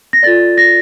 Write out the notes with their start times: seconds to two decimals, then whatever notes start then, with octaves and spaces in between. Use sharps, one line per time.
0.13 A#6
0.23 F4 A4 D5 A6
0.58 A#6